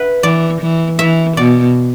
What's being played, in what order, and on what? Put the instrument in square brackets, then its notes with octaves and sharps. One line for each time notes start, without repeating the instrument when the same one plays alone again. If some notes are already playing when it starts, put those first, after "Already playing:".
Already playing: [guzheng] B4 E5
[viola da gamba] E3 [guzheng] D5
[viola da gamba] E3
[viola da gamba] E3 [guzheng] E5
[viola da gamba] B2 [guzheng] D5